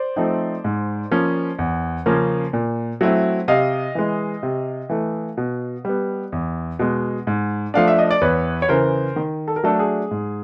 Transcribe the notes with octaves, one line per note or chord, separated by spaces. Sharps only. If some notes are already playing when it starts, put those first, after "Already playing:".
Already playing: C5 D5
F3 A3 C4 D#4
G#2
F3 A#3 C#4
E2
C#3 F3 A#3 C#4
A#2
F#3 A3 C4 E4
C3 D#5 F5
E3 G#3
C3
E3 A3
B2
G3 B3
E2
B2 G#3
G#2
F3 A3 D4 F5
E5
D#5
D5
E2 B4 C#5
C#5
C#3 E3 A#4 C5
D#3
A4
A#4
F#3 A3 D4 A4
G#4
G#2